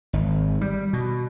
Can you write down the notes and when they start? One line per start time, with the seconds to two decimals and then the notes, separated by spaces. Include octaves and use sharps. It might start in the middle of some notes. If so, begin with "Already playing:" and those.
0.13 G#1
0.61 G3
0.93 B2